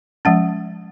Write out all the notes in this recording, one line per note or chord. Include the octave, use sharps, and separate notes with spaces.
F3 G#3 C#4 F#5